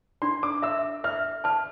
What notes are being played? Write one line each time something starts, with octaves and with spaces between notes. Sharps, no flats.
D4 C6
D6
E5 E6
E5 F6
A5 F6